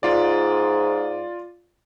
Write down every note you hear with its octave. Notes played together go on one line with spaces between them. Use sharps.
G#2 F4 D5